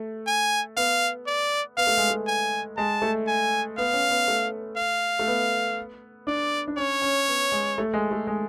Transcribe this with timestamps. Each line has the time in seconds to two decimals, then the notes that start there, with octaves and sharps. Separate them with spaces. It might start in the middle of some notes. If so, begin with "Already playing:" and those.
Already playing: A3
0.27 G#5
0.77 B3 F5
1.27 D5
1.77 B3 F5
1.87 A3
1.98 G#3
2.09 A3
2.27 G#5
2.77 G#3 A5
3.02 A3
3.27 G#5
3.78 B3 F5
3.93 C#4
4.10 B3
4.28 A3
4.77 F5
5.19 A3
5.27 B3
6.27 D4 D5
6.68 D4
6.77 C#4 C#5
7.02 C#4
7.28 B3
7.52 G#3
7.78 A3
7.94 G#3
8.11 A3
8.27 G#3